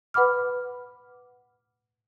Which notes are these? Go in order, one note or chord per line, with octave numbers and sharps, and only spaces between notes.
B4 F#5 B5 D6 F6